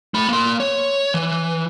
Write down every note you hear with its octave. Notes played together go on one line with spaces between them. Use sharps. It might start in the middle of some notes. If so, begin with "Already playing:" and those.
A3 B5
A#3 C6
C#5
E3